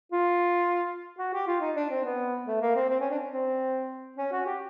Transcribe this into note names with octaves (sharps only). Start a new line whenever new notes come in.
F4
F#4
G4
F4
D#4
D4
C4
B3
A3
A#3
C4
C4
C#4
D4
C4
C#4
F#4
G4